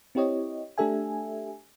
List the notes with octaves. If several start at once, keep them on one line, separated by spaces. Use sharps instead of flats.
C4 E4 G4 C#5 D#5
A3 D4 G4 A4 E5 G#5